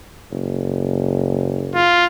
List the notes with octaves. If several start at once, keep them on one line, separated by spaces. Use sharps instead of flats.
F#1
F4